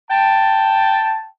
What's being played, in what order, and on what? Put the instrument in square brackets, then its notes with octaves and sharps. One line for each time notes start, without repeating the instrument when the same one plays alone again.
[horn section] G5 A5